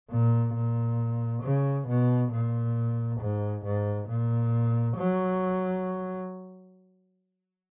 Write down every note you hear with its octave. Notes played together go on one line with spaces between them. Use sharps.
A#2
A#2
C#3
B2
A#2
G#2
G#2
A#2
F#3